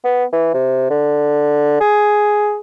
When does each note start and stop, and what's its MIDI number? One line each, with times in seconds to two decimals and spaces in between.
0.04 0.24 59
0.32 0.52 52
0.54 0.90 48
0.90 1.79 50
1.80 2.60 68